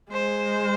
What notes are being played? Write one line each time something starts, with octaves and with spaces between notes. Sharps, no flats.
G#3 C5